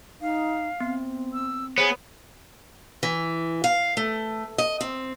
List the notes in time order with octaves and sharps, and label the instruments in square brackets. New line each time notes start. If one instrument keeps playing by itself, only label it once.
[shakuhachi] D#4 [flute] F5
[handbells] B3 [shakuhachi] C4
[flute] E6
[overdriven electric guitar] B3 [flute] G#4 [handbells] C5 C#5
[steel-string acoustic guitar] E3
F5
A3
D#5
C4